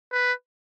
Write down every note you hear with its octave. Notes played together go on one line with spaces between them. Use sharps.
B4